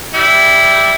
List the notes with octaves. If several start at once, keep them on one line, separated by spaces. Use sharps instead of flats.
G3 E4